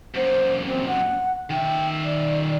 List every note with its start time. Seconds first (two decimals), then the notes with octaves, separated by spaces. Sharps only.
0.15 F#2 A#2 C5
0.65 C4
0.87 F#5
1.50 D#3 E5 G5
2.04 D5